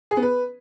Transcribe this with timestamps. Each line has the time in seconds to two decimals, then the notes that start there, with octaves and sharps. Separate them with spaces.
0.11 G#4
0.17 B3
0.23 B4